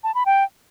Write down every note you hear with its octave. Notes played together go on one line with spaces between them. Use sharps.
A5
B5
G5